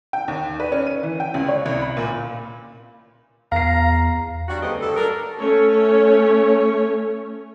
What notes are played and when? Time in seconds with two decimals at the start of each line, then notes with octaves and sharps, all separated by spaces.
0.13 G5
0.28 D#2
0.60 B4
0.72 C#4
0.87 D#7
1.03 E3
1.20 G5
1.34 C#2
1.48 C#5
1.66 C2
1.81 B5
1.97 A#2
3.52 E2 F5 A#5 C7
4.48 F#3 G3 D4 F#4
4.62 D2 C#3 B3 C4 G4 D#5
4.81 G2 A4
4.96 F#3 D4 A4 A#4
5.39 A3 C#4 C#5